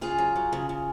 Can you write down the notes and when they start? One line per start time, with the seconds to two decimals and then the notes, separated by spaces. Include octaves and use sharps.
0.01 C#3 F4 G#4
0.18 F#3
0.36 F#3
0.53 C#3
0.69 C#3